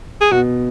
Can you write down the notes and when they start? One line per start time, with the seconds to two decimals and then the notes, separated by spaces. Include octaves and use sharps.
0.21 G#4
0.31 B2 F#4